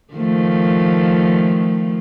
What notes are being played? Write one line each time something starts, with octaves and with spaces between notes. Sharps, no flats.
D#3 F3 A3